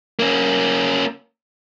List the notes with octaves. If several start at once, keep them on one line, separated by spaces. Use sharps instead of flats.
A#3 C#4